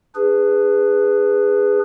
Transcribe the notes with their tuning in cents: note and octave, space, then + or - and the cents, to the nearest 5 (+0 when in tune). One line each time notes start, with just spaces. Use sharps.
D4 +0 G#4 -15 B4 +5